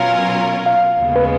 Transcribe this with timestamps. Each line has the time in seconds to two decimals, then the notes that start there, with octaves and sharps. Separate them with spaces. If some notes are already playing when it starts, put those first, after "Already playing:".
Already playing: B2 F#3 C#4 F4 A#4 F5
0.66 F5
0.99 D#2 C#3 G#3 B3
1.16 B4